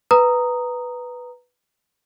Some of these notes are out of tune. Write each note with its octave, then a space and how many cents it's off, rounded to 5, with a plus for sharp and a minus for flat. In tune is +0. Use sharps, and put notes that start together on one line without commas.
B4 +0 A#5 -5 D#6 +0